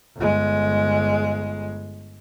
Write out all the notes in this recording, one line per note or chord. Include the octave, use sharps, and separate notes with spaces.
G1 G#3